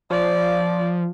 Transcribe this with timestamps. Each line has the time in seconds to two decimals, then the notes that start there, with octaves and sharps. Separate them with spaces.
0.10 F3 D5